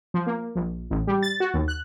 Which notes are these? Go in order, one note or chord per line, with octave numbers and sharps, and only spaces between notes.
F3
A#3
A#1
A1
G3
A6
F#4
D#2
F#6